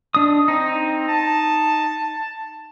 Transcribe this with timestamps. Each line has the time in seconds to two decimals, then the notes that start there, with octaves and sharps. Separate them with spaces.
0.15 D4 D#5 D#6
0.48 C4 D#4
1.09 A5